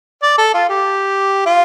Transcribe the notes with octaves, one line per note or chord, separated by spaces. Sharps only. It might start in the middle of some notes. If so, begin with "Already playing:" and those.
D5
A4
F4
G4
F4